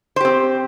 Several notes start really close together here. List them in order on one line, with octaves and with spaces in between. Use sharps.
C5 G4 C4